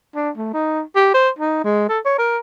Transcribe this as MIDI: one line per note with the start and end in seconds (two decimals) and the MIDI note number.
0.15 0.30 62
0.37 0.51 57
0.54 0.81 63
0.95 1.13 67
1.14 1.29 72
1.39 1.63 63
1.64 1.86 56
1.89 1.99 69
2.05 2.15 73
2.19 2.38 70